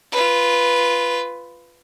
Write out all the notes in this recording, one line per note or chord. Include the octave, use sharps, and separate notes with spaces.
F4 B4